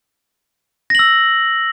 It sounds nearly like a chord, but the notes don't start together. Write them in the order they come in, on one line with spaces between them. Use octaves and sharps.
A#6 F#7 E6